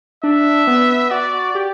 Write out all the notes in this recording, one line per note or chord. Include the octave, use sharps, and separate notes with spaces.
D4 E5
B3
F#4 D5
G4